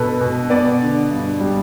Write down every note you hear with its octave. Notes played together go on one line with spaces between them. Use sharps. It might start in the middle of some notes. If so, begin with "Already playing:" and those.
Already playing: B2 B3 A4 B4
B2
B3 D5
D3
G2
G3